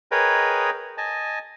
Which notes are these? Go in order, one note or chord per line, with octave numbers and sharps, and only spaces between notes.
G#4 A#4 B4 C#5 D#5 G5
D#5 G#5 A5